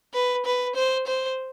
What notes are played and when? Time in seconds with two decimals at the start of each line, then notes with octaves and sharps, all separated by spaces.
0.14 B4
0.45 B4
0.75 C5
1.07 C5